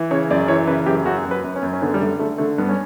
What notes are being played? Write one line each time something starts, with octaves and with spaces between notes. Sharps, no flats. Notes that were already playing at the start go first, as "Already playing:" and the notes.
Already playing: E3
C#3 C#5
F#2 D5
D5
E3 C#5
C#3 B4
F#2 G4
F#2 F#4
F#2
B4
F#2
C#4
F#2
C#4
D3 B3
G3
D3 A3
D3 A3
D3 A3
G2 B3
C#4